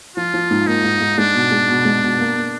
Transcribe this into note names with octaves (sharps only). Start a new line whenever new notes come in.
F3 F4
F3
G#2
A#3 D#4
G#2
G#2
G#3 D4
B2
G#3
B2
G#3
B2
A#3
A#3